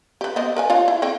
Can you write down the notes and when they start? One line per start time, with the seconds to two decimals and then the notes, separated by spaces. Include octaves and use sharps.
0.21 G4 B4
0.36 B3 C4 D#5
0.57 A#4 B4 G#5
0.70 F4 C#5 F5
0.88 E4
1.02 C4 G#4 G5